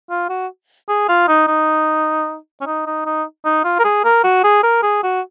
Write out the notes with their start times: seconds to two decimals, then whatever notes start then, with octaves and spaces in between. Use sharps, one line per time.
0.10 F4
0.29 F#4
0.89 G#4
1.09 F4
1.28 D#4
1.47 D#4
2.61 C#4
2.66 D#4
2.86 D#4
3.06 D#4
3.45 D#4
3.64 F4
3.79 A#4
3.84 G#4
4.04 A#4
4.24 F#4
4.44 G#4
4.63 A#4
4.83 G#4
5.03 F#4